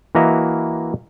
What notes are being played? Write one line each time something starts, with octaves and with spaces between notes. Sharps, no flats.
E3 A#3 F#4 A#4 D#5 E5